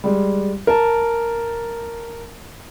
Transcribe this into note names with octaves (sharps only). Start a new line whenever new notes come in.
G3 G#3
A#4 A5